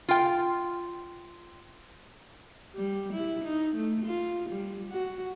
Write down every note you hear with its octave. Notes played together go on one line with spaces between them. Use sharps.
F4 G5
G3
E4
D#4
A3
F4
G3
F#4